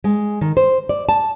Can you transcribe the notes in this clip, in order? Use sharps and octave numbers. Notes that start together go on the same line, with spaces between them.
G#3
D#3
C5
D5
A5